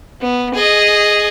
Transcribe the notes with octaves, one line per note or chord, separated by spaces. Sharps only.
B3
G#4 D#5